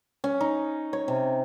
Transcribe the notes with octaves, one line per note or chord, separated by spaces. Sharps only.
C#4
D#4
C#5
C3